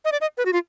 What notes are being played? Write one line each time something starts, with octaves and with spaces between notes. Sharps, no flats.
D#5
D5
D#5
B4
F#4
F4